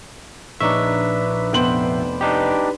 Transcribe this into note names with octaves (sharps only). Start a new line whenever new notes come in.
A#1 D4 D#4 B4 C#5 E5
F1 B3 C5 G5 F#7
D4 D#4 G4 B4